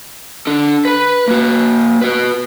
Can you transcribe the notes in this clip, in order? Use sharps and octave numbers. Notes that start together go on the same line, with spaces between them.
D4 A4
B4 B5
A#3 F#4
F#4 B4